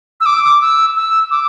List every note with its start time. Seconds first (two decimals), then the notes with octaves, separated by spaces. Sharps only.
0.21 E6
0.26 D6
0.61 E6
0.96 E6
1.31 D6